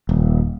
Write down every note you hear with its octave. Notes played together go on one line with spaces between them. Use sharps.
D#1